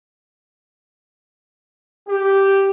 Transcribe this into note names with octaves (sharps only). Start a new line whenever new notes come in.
G4